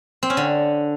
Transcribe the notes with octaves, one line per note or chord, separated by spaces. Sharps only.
C4
C#4
D3